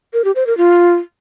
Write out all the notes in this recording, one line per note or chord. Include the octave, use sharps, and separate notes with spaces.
A#4
G4
C5
A#4
F4